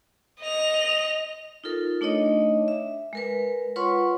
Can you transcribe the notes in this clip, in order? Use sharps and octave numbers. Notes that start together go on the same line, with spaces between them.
D#5 F7
D#4 F4 A4 A#4
A3 D4 D#4 C#5 D#5
E5
G#3 A#4 B4
F4 B4 C#5 F#5 C6 C#6